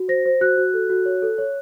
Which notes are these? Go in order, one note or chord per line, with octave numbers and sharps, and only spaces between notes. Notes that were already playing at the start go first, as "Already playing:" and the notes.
Already playing: F#4
C5 A#6
C5
F#4 F#6
F#4
A4
F#4
C#5
A4
C#5